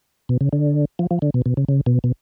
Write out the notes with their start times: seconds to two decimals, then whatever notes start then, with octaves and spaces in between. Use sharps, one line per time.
0.29 B2
0.41 C#3
0.53 D3
0.99 F3
1.11 F3
1.22 D3
1.34 B2
1.46 B2
1.57 C#3
1.69 C#3
1.86 B2
2.04 B2